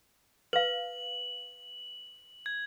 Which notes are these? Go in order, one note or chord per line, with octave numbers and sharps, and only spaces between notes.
B4 F5 F#7
G#6